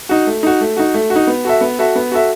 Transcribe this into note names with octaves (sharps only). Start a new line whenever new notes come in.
D#4 F#4
A3
D#4 F#4
A3
D#4 F#4
A3
F#4
D#4
B3
F#4 A4 E5
B3
F#4 A4 E5
B3
F#4 A4 E5